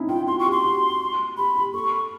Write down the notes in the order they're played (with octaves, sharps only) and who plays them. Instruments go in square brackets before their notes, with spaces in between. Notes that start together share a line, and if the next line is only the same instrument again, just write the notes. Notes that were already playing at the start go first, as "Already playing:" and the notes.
Already playing: [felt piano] C4 C#4 D#4 E4
[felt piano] F4 [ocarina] G5
[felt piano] F#4 [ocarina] C6
[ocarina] C#6
[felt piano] G4
[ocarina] C6
[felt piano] F#4
[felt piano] G4 [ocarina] B5
[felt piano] G4
[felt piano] A4 [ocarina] C#6